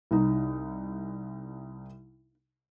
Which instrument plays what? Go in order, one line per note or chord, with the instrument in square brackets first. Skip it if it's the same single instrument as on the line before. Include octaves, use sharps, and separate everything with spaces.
[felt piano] C2 D#4